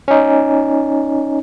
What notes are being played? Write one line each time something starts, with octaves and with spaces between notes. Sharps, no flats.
C#4 D#4